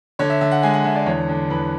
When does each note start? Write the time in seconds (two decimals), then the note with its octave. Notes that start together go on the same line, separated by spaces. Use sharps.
0.19 D3 C#5
0.30 E5
0.41 D3 E5
0.51 F#5
0.63 G#3 G#5
0.74 F#5
0.84 D3 E5
0.95 D5
1.06 E2 C#5
1.29 D3
1.50 E2 B4